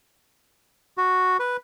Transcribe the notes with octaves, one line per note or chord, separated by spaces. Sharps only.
F#4
B4